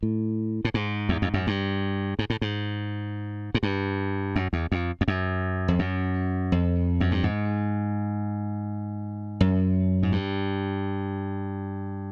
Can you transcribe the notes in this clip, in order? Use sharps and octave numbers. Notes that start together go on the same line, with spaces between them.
A2
A2
G#2
E2
F2
F#2
G2
G#2
A2
G#2
G#2
G2
F#2
E2
F2
F2
F#2
F2
F#2
F2
F#2
G2
G#2
F#2
G#2
G2